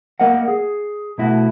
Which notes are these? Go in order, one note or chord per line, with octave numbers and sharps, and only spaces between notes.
A#3 A#4 D#5 F#5
G#4
B2 A3 E4 F#4